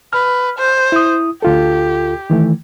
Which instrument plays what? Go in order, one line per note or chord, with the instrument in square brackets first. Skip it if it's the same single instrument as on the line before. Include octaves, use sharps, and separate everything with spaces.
[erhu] B4 [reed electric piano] F6
[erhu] C5
[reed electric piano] E4 D#6
[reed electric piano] D2 F4 A4 [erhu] G4
[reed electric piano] D#3 E3 A3